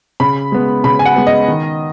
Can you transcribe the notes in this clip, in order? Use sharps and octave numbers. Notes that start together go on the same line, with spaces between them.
C#3 B5
G#3 B3
C#3 B5
G#5
F#5
G#3 B3
D#5
D#3